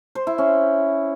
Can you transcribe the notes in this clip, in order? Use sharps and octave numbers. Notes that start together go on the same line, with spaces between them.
C5
E4
C#4